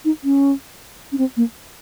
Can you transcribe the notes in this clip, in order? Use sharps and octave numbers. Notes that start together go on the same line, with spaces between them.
D#4
C#4
C#4
C4
A#3